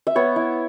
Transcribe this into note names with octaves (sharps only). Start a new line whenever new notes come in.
E5
B3 C#5
E4